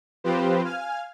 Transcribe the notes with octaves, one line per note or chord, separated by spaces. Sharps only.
F3 C4 F4 G4 B4 C5
F5 G#5 F6